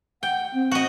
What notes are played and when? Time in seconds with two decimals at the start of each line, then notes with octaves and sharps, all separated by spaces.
0.23 F#5 G5
0.54 C4
0.71 F#4 D#5